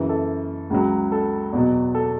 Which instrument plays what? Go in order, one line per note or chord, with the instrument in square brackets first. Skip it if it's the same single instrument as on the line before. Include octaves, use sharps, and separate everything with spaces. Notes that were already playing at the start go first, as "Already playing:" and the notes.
Already playing: [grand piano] F#2 C#3 E3
A4
C#2 C#3 F#3
A4
E2 B2 F#3
A4